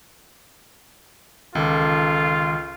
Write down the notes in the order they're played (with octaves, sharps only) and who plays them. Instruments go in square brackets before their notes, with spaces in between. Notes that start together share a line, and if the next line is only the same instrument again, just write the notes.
[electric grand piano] C#2 [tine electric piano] D#3 C#4 D6 [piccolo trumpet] F4 [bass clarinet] A4